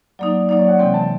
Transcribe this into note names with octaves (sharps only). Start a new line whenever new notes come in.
F#3 A#3 D#4 D5
F#3 A#3 D#4 D5
C#5
F#5
C3 E3 G#3 C4 G5
A5